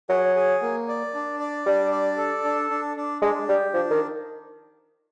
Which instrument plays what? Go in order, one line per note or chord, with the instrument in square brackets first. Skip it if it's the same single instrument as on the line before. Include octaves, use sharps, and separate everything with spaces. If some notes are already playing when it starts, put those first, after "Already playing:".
[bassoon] F#3 [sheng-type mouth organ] G#4
[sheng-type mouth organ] G#4
A#3
D5
D4
D5
[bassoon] G3 [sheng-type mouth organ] D4
[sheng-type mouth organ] D5
A4
D4
D4
D4
[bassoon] G#3 [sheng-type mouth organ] D4
[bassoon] G3 [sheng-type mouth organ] G4
[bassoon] F3 [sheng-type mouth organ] D4
[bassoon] D#3